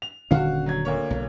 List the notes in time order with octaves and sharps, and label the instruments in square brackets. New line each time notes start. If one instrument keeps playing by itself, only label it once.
[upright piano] F7
[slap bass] D#1 D3 C#4 [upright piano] F#4 F5
[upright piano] F#3 G#6
D2 A#3 C#5
[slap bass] B1